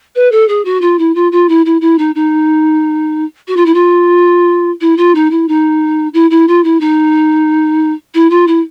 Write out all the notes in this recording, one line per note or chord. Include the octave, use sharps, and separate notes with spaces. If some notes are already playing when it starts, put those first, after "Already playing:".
B4
A4
G#4
F#4
F4
E4
F4
F4
E4
E4
E4
D#4
D#4
F#4
F4
E4
F4
E4
F4
D#4
E4
D#4
E4
E4
F4
E4
D#4
E4
F4
E4